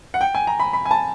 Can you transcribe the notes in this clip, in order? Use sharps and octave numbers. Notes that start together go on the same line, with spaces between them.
F#5
G5
G#5
A#5
B5
B5
G#5
A5